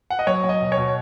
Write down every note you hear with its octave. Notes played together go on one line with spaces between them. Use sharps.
F#5
D#5
F#3 C#5
F#3
D#5
B2
C#5
B2